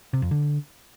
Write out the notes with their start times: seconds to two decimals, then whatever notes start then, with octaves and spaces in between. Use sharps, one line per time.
0.13 C3
0.22 F2
0.31 D3